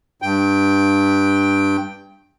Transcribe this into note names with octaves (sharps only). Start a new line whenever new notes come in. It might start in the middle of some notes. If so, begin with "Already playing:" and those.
G2 G5